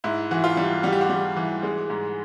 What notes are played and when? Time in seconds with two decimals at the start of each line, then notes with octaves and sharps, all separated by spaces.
0.04 G#2 E4
0.31 E3 F#4
0.44 F4
0.57 G3
0.83 G3 F#4
0.93 G4
1.01 F#4
1.10 G3
1.36 E3
1.63 G#3
1.90 G#2